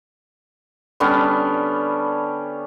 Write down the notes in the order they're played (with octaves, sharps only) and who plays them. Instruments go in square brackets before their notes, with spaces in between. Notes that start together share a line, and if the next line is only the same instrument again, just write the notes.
[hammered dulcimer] D3 G3 B3 C#4